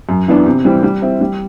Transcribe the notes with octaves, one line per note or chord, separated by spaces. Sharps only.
F#2
E3 B3 D4
C3
E3 G3 C4
G3
C4 E4
G3